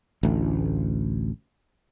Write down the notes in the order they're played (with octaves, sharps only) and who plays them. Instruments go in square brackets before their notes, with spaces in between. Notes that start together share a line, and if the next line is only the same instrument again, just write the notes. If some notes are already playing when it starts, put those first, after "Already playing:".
[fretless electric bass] A1 D2